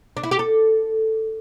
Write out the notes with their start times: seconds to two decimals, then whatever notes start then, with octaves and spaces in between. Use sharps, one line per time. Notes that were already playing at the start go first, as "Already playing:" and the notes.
0.17 D4
0.23 E4
0.31 G4
0.39 A4